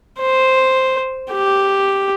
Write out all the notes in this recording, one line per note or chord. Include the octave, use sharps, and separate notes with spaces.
C5
G4